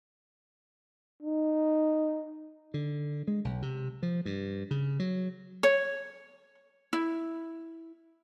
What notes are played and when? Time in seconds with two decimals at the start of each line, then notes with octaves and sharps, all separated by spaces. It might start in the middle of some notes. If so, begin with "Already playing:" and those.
1.22 D#4
2.74 D3
3.28 G#3
3.45 B1
3.62 C3
4.03 F3
4.25 G2
4.71 C#3
5.00 F#3
5.63 C#5
6.93 E4